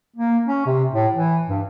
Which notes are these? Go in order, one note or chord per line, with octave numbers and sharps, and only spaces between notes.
A#3
C#4
C3
A2
E3
G2